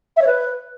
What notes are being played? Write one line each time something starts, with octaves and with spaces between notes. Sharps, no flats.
E5
C#5
B4